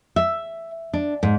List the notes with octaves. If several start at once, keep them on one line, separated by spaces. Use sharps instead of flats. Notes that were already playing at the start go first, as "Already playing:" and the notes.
E5
D4
G#2